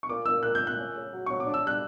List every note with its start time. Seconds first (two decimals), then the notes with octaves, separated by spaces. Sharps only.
0.03 C#6
0.09 A#2 D6
0.26 A#2 E6
0.43 A#2 F#6
0.55 G6
0.61 A#2
0.67 F#6
0.77 C#4
0.95 C#3
1.12 F#3
1.26 F#3 C#6
1.40 D6
1.46 D4
1.54 E6
1.63 G3 F#6